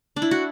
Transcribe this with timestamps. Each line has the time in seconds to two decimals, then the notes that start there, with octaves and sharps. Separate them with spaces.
0.16 D4
0.22 E4
0.31 F#4